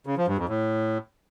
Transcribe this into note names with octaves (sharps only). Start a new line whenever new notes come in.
C#3
F3
G2
F2
A2